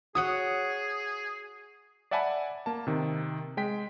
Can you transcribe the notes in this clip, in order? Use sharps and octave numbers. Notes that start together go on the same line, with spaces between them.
F#4 G#4 C#5 F#5 D#6
D5 E5 F#5 G#5 A5 B5
A#3 A5
C3 D#3
G#3 G5 B6